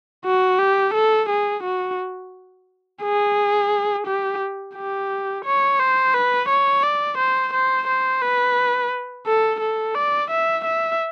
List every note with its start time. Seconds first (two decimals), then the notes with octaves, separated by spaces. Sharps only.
0.25 F#4
0.59 G4
0.94 A4
1.29 G#4
1.63 F#4
3.02 G#4
4.07 G4
4.76 G4
5.45 C#5
5.79 C5
6.14 B4
6.49 C#5
6.83 D5
7.18 C5
7.54 C5
7.88 C5
8.22 B4
9.27 A4
9.61 A4
9.95 D5
10.31 E5
10.65 E5